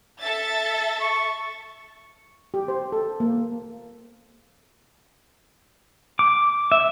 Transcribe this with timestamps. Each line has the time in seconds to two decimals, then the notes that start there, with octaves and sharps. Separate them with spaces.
0.20 A4 E5 A6
1.01 C#6
2.54 G4
2.68 C5
2.92 A4
3.20 A#3
6.19 D6
6.72 E5